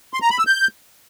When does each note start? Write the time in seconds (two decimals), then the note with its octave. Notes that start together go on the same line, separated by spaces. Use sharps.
0.14 C6
0.22 A#5
0.30 B5
0.38 E6
0.47 G6